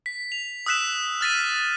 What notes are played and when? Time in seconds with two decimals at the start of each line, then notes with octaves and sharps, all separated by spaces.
0.06 B6
0.32 F7
0.66 D#6 E6 F#6 B6 E7
1.21 F6 A6 B6 D#7